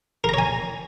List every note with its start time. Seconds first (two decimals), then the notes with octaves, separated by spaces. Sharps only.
0.24 A#4
0.29 A#5
0.34 C#5
0.38 G#5